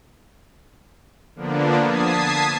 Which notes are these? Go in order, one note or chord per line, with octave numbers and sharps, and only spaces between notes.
D3 F3 A#3 B3 D4
A5 D#6 G#6 B6 C7